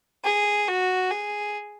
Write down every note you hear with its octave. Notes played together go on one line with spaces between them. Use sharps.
G#4
F#4
G#4